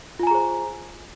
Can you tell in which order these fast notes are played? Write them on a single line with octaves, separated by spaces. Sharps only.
F4 G#5 A#5 G#4 C5